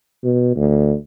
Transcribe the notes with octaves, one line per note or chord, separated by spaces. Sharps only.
B2
D2